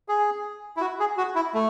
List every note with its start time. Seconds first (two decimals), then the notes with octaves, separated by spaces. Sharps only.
0.08 G#4
0.77 E4
0.81 F#4
1.00 G#4
1.17 F#4
1.35 E4
1.54 A3